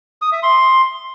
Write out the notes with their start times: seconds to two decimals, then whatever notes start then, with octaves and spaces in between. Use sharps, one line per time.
0.22 D#6
0.32 E5
0.43 C6